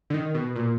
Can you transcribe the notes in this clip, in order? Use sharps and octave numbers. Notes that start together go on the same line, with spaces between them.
D3
D#3
B2
A#2